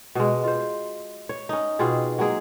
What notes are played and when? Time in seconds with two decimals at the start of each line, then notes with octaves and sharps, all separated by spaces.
0.15 B2 G#3
0.44 F4 C5
1.29 C#5
1.49 C#4 D#4
1.79 B2 C4 F4 G#4
2.18 F#3 G#3 A#3 G#4